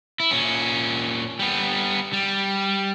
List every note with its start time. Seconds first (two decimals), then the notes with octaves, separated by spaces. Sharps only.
0.20 E4
0.31 A#2 C#4
1.39 G3 B3
2.13 G3